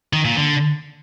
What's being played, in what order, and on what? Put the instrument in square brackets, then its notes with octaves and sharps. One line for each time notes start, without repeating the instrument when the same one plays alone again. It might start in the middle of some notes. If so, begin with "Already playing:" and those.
[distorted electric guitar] D#3
A#2
D3